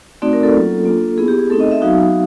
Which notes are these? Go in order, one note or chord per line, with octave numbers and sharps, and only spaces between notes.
A3 C4 D#4 F#4 D5
A#4
A4
F#3 A#3 C#4 F4
A#3 D4 F4
B3 E4 G#4
G4
G#4
A3 C4 D#4 A4
D#5
E5
F#3 B3 D#4 F#4 F5